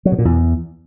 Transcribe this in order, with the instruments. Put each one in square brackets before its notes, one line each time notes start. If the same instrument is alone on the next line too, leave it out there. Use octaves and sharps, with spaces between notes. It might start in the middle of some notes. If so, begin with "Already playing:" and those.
[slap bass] F#3
B2
A#2
E2